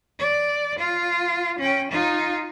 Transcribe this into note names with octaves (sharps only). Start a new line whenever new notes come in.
D5
F4
C#4 G5
D#4 F4